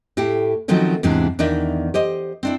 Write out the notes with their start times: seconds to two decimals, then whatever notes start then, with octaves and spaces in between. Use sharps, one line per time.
0.17 A2 E4 G4
0.68 D#3 F3 F#3 A3 C4 C#4
1.03 E2 G#2 C3 E3 D4
1.39 E2 D#3 D4 D#4 E5
1.94 G4 C5 D#5
2.43 C4 D4 E4